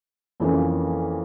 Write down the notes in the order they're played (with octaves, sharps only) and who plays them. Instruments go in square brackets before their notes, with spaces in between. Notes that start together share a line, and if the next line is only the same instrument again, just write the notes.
[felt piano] F2 E3 A#3 C#4